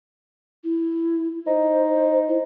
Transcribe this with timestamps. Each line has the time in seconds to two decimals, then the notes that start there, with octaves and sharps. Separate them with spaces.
0.64 E4
1.47 D#4 C5
2.28 E4